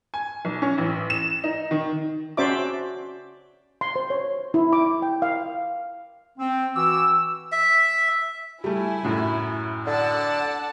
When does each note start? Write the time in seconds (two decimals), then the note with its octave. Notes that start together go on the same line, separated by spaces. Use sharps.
0.14 G#5
0.45 B1
0.62 C#4
0.78 A1
1.10 E7
1.44 D#4
1.71 D#3
2.37 C#4 F#4 C5 D5 E5 D6
3.81 C6
3.96 C5
4.10 C#5
4.54 E4
4.73 D6
5.02 G5
5.22 F5
6.38 C4
6.75 E3 F#4 D6 E6
7.52 E5
8.64 G3 A3 E4 G#5
9.03 F#2 A2 F#3
9.87 D3 D5 F#5 A5